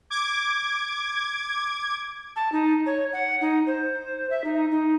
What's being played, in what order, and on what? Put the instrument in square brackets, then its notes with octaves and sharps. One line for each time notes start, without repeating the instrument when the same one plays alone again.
[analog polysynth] D6 G#6
[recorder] A5
D#4
C#5
F#5
D#4
C5
E5
D#4
D#4